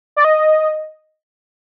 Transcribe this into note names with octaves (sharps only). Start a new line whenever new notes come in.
D5
D#5